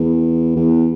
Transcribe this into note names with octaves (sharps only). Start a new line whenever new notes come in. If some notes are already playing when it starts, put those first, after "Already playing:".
Already playing: E2
E2